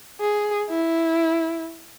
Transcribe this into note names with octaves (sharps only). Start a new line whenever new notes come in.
G#4
E4